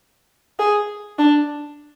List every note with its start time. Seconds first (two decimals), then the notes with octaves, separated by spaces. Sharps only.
0.59 G#4
1.18 D4